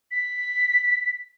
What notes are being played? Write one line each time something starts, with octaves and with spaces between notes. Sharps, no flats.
B6